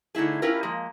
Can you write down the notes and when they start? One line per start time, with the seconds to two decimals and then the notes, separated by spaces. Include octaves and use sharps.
0.15 D3 A3 D#4 E4 G#4
0.42 C#4 E4 F4 G4 A#4 B4
0.63 F3 G#3 A#3